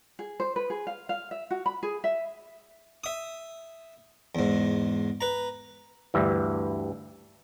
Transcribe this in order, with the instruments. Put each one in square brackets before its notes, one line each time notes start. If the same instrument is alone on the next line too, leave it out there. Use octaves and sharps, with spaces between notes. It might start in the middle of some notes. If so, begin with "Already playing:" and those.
[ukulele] G#4
C5
B4
G#4
F5
F5
E5
F#4
B5
G#4
E5
[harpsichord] E5 D#6
E2 G#2
B4 A#5
[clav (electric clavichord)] D2 G2 E3